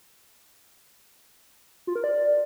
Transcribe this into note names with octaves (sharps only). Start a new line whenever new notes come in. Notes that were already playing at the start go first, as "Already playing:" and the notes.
F4
A#4
D5